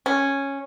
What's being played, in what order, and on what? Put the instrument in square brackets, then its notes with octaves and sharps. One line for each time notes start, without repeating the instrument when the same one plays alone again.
[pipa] C#4